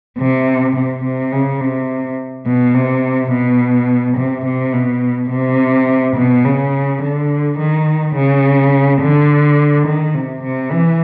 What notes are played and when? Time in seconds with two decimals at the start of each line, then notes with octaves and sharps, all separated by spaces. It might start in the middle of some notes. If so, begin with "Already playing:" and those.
0.19 C3
0.76 C3
1.04 C3
1.33 C#3
1.61 C3
2.46 B2
2.75 C3
3.32 B2
4.17 C3
4.45 C3
4.74 B2
5.31 C3
6.16 B2
6.45 C#3
7.02 D3
7.59 D#3
8.15 C#3
9.01 D3
9.86 D#3
10.15 C3
10.43 C3
10.72 E3